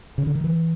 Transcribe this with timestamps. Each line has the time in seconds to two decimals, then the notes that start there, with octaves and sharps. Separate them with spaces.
0.18 C#3
0.27 D3
0.35 D#3
0.44 E3